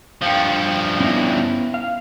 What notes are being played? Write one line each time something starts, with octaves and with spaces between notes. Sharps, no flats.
G2 F3 F5 G5 C#7
B3 C#4 E4 E5 A#6
F5